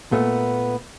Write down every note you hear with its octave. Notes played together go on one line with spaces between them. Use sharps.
A#2 A3 B3